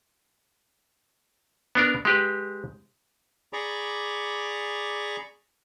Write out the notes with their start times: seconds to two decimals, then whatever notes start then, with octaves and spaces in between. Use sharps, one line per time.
1.75 B3 D4 A#4
2.05 G#3 G4 B4
3.53 G#4 D5 A#5 B5 C#6 D6